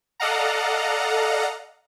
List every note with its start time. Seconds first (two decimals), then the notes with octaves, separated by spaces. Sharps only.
0.20 A4 D5 D#5 F5 F#5 A#5